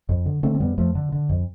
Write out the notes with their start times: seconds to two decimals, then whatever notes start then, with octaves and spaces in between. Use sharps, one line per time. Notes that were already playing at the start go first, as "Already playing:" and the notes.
0.09 F2
0.26 D3
0.43 D3 A3 C4
0.55 C4
0.60 F2 G3 B3
0.78 F2 F3 A3
0.95 D3
1.12 D3
1.29 F2